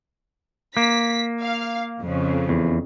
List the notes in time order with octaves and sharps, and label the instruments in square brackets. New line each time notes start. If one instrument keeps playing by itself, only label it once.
[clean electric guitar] A#3 [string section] B6
[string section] F5
F2 C#3
[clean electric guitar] E2